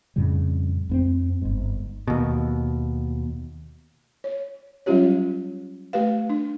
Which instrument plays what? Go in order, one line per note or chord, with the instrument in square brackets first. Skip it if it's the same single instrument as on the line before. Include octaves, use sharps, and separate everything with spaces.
[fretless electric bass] F2 A2 C#3 G3
F2 B3 C4
G1 G#2
[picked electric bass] D#2 B2
[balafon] C#5
F#3 G3 C#4 F4 G4 C#5
A3 G4 B4 F5
D4